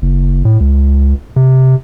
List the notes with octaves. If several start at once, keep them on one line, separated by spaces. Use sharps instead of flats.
F#1
A2
C#2
C3